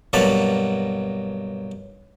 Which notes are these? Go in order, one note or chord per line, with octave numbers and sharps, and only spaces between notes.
G2 B2 F#3 A#3 A5 B5